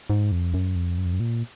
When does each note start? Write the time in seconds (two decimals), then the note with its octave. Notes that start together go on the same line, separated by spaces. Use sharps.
0.10 G#2
0.32 F2
0.54 F#2
0.75 F2
0.98 F#2
1.06 F2
1.13 F#2
1.20 A#2